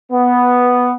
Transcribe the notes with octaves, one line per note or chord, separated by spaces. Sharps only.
B3